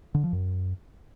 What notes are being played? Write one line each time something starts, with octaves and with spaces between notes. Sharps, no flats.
D3
F3
F#2